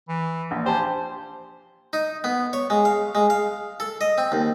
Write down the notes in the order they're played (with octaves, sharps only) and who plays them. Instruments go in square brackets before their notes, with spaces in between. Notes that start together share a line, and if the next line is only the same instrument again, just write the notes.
[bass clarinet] E3
[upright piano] A#1
[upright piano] G4 G#5 A5 [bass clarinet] C5
[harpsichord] D#4
B3
C#5
G#3
F5
G#3
F5
A4
D#5
C4
D#2